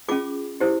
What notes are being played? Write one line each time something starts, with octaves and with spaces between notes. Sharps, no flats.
C#4 F4 G#4 D6
E4 G4 C5